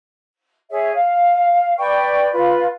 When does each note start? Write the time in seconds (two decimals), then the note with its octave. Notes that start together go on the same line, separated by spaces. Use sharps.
0.70 G#4 C#5 E5
0.94 F5
1.79 B4 D5 G5 C#6
2.31 F4 B4